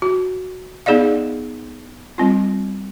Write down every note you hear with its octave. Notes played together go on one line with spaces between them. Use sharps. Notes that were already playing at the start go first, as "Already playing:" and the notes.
F#4
B3 D#4 G#4 D5 D#5 F5
G3 C4 F4